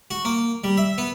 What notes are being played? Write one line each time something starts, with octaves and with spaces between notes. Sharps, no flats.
F#4
A#3
G3
E5
B3